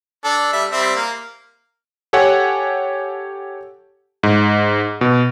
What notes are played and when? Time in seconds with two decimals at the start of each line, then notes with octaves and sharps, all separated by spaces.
0.25 D4 A4
0.53 G3 E5
0.72 G3 C4 E5
0.96 A#3
2.13 G4 A4 C#5 F#5 G#5
4.23 G#2
5.01 B2